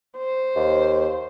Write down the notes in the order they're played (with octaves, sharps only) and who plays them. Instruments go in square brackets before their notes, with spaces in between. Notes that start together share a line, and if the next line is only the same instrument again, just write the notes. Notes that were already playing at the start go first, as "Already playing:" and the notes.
[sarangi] C5
[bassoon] D#2